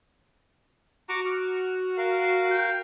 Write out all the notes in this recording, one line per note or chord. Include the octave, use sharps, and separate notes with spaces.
F#4 A#5 C#6 D6
F6
A#4 F5
G5